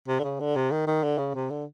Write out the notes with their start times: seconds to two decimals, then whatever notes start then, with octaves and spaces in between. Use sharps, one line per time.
0.08 C3
0.20 D3
0.24 C#3
0.40 D3
0.56 C3
0.72 D#3
0.87 D#3
1.04 D3
1.18 C#3
1.35 C3
1.50 D3